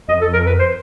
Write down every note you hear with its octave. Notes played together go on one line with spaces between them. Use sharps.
F2 D#5
A4
A#4
B4
C5